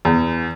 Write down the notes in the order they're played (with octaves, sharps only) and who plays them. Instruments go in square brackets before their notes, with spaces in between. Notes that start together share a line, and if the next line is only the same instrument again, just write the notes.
[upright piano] E2